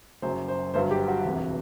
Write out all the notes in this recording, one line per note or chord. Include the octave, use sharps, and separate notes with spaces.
F#1 F#2 F#3 C5
C5
G1 G2 F#3 C5
G4
F#4
E1 D2 C3